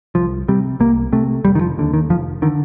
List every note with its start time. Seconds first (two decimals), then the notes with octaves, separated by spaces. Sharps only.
0.15 C2 F3
0.48 C3 G3
0.80 C2 A#3
1.13 C3 A3
1.45 F1 G3
1.55 D#3
1.61 F3
1.78 D#2 D3
1.93 D#3
2.10 F1 F3
2.42 D3 D#3